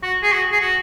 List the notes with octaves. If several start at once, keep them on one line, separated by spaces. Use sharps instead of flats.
F#4
G#4
F#4
G#4
F#4